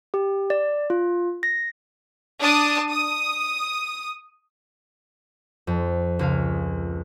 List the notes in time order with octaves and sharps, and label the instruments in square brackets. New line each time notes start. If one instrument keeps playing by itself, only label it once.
[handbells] G4
D5
F4
A#6
[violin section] D4 A5 D#6
D#6
[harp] F2
C#2 G#4 F5